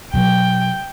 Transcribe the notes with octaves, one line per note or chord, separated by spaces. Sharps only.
B2 F#3 G5